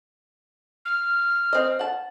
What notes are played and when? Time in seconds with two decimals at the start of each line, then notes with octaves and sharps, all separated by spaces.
0.85 F6
1.53 C4 D#5
1.79 F#5 A5